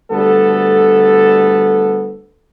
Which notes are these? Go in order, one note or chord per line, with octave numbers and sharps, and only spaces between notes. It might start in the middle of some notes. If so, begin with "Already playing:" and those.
D2 G3 B3 A4